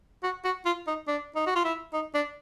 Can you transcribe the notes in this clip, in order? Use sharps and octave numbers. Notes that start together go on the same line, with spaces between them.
F#4
F#4
F4
D#4
D4
D#4
F#4
F4
E4
D#4
D4